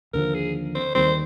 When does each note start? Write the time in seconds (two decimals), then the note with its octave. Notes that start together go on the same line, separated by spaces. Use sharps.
0.13 D#2 D3 F3 A#4
0.35 G#4
0.75 C5
0.95 D#2 D#3 G3 C5